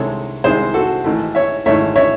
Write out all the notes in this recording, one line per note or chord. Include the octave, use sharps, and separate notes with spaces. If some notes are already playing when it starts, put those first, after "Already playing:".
Already playing: C2 C3 D#3 G#3 A4 C#5
C2 C3 D#3 G#3 G#4 C5
F#4 A4
G#1 G#2 E3 A3
C#5 E5
G#1 G#2 E3 A3 C#5 E5
C#5 E5